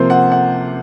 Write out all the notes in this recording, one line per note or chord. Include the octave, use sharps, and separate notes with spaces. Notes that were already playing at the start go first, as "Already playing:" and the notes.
Already playing: C3 F3 A#3 C5
F#5
F#5